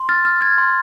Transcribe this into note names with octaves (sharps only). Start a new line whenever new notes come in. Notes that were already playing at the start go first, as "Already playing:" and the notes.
Already playing: C6
F6 A6
F6
F6 G#6
C6